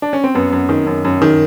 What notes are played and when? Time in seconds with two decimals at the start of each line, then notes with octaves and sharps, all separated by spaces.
0.02 D4
0.13 C#4
0.24 C4
0.35 F#2 B3
0.52 F#2
0.69 D#3
0.87 F#2
1.05 F#2
1.22 D#3